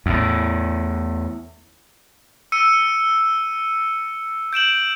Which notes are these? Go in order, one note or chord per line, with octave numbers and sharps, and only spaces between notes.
E2 A2
E6 C#7 D#7
G6 D7 E7 F#7